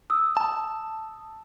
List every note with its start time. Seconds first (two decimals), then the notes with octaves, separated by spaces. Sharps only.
0.10 D#6 E6
0.37 A5